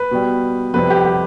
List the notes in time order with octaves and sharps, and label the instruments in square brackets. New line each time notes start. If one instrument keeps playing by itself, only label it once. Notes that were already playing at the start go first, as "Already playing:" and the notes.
Already playing: [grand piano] B4
B2 G3
F2 C3 G3 B4
G4
G4